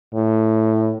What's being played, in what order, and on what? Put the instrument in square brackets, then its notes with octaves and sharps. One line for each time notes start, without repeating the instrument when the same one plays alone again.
[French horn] A2